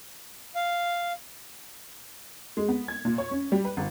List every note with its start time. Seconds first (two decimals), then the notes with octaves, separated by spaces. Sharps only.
0.55 F5
2.57 G#3
2.68 B3
2.88 G#6
3.05 A#2
3.18 C#5
3.31 C#4
3.52 G3
3.65 B4
3.77 G1